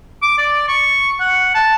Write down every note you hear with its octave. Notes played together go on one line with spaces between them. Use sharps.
D6
D5
C#6
F#5
A5